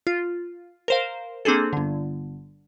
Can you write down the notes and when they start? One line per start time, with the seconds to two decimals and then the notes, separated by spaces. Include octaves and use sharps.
0.07 F4
0.88 A#4 C5 F5
1.45 A#3 C4 D4 G#4 A4
1.73 G1 D3